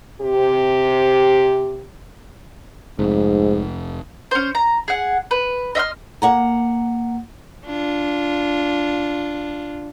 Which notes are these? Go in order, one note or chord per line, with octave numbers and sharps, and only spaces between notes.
C3 G4
F1 G#2
C#4 C5
A#5
G#4 F#5
B4
D#5 E5 C6 F6
A#3 F#5 A#5
D4 F4